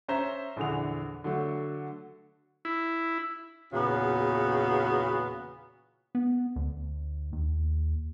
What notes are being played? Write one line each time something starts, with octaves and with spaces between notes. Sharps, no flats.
C#4 C5 E5 A#5
A#1 E2 D3 G#4 F7
D3 F#3 A3
E4
E2 A#2 C#3 B3 F#4
B3
D2
D#2